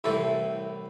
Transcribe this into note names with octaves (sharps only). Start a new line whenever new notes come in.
C2 A2 E3 C4 A4